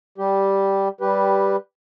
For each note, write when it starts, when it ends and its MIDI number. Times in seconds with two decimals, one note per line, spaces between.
0.18 0.88 55
0.18 0.88 67
1.01 1.56 55
1.01 1.56 67
1.01 1.56 71